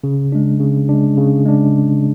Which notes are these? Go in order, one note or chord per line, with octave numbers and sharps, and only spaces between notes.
C#3
G#3 D4
C#3
G#3 D4
C#3
G#3 D4